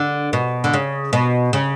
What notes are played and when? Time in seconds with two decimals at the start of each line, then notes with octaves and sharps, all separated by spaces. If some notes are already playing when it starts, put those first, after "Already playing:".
Already playing: D3
0.33 B2
0.64 D3
0.73 C#3
1.13 B2
1.53 C#3